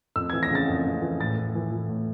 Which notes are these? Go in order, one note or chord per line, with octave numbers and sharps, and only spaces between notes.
F2 E6
E3 G#6
A#6
C#3 A6
F2
F2
E3
A2 A6
A2
E3
E3
A2